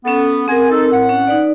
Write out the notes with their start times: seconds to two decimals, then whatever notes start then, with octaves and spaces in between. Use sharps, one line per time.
0.05 B3 C#4 A4
0.48 C4 G#4 A#4 F#5 G#5
0.70 D#4 A4
0.92 A2 F#5
1.09 C#4
1.27 D#4 B4 D5